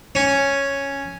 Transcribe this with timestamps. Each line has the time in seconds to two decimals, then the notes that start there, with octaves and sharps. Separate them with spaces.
0.15 C#4